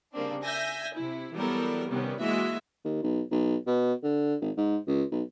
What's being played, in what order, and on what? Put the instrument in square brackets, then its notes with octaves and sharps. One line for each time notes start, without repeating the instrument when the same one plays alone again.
[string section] C#3 G3 A#3 C4 D4
E5 G#5 G6 A#6
C3 E4
E3 F#3 G3 B3 A4 A#4
C3 D#3 G3 B3 C#4
E3 G#3 A#3 F#4 D#5 E5
[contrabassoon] D#2
B1
B1
B2
D3
G#1
G#2
C#2
B1